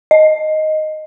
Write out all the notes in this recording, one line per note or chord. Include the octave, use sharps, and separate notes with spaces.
D#5